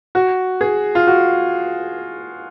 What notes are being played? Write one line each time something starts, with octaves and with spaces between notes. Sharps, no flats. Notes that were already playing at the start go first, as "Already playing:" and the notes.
F#4
G#4
F4
F#4